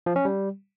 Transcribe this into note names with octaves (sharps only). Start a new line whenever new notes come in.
F3
C#4
G3